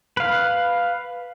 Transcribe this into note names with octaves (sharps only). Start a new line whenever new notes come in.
B4 F5